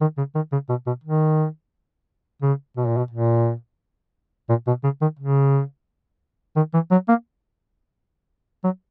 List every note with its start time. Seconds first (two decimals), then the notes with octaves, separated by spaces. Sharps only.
0.01 D#3
0.17 C#3
0.35 D#3
0.52 C#3
0.69 B2
0.87 B2
1.04 D#3
2.42 C#3
2.77 B2
2.87 A#2
2.97 B2
3.11 A#2
4.49 A#2
4.67 B2
4.84 C#3
5.02 D#3
5.19 C#3
6.56 D#3
6.74 E3
6.92 F#3
7.09 A#3
8.64 F#3